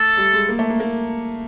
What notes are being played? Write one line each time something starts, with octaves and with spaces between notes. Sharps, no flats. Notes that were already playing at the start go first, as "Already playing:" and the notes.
Already playing: A3 A4
G3
G#3
A#3
A3
A#3
A#3